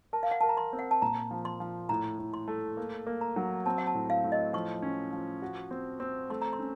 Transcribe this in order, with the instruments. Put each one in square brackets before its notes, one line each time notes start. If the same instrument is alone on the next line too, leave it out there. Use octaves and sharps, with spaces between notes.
[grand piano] A#4 [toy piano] A5
[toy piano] F5
F#5
[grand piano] A#4 [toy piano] A5
[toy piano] A#5
C6
[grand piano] C4
[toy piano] F#5
A5
[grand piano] A#2 [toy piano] A#5
[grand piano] F3
[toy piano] C6
[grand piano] F3
[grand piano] A2 [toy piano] A#5
[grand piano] A2
[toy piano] C6
[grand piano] A3
A#3
A#3
[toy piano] A#5
[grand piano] F#3
[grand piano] C4 [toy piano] A5
[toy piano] F#5
A5
[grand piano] A2
[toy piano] F5
[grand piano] A2
[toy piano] D#5
[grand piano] F3 [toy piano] C#6
[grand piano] C#4
F3
F#4
C4
C4
[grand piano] A3 [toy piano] C6
[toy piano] A#5
C6
[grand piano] C#4